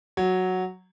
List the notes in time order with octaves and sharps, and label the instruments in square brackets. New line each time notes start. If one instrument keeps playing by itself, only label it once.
[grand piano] F#3